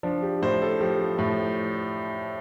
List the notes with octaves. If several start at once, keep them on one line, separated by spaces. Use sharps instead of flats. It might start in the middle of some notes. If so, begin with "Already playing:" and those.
F3 D4
G4
A2 C5
A4
F3 G4
A2